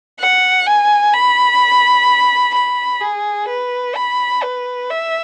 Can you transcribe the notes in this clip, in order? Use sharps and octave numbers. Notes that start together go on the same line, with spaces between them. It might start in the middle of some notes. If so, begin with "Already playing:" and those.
F#5
G#5
B5
B5
G#4
B4
B5
B4
E5